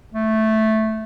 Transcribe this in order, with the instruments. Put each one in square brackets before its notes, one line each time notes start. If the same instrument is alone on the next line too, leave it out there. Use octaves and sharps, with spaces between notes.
[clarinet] A3